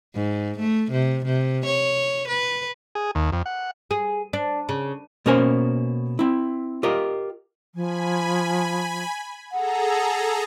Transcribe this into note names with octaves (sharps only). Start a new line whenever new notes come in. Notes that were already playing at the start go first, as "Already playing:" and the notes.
G#2
A3
C3
C3
C#5
B4
G#4
D#2
F2
F#5
G#4
D4
C#3
B2 A#3 C#4 A#4 C5 G#5
C4 E4
F4 G4 A#4 D#5
F3 G#5 B5
G#4 A4 F#5 A#5